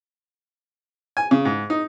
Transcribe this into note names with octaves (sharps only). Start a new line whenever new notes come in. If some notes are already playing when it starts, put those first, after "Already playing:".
G#5
C#3
G#2
D#4